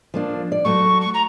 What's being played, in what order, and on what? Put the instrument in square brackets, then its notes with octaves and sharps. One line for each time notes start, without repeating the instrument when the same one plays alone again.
[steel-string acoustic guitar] F3 A#3 D4
D5
[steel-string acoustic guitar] F#3 A3 F#4 [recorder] C#6
[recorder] C#6
A#5